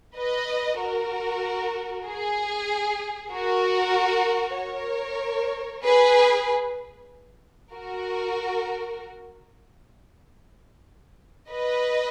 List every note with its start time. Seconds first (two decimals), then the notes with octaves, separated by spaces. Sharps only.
0.16 B4 D#5
0.79 F#4 A#4
2.06 G#4
3.31 F#4 A#4
4.57 A#4 C#5
5.83 G#4 B4
7.72 F#4 A#4
11.50 B4 D#5